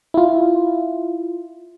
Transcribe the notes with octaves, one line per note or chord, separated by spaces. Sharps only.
E4 F4